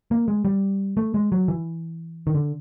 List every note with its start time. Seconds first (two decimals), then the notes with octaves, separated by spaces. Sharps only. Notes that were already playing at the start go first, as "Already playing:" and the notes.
0.11 A#3
0.28 G#3
0.45 G3
0.97 A3
1.14 G#3
1.32 F#3
1.48 E3
2.27 D#3
2.35 D3